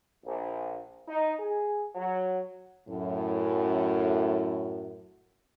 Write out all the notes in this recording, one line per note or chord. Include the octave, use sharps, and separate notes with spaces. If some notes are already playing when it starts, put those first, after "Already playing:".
A#1
D#4
G#4
F#3
F#2 A2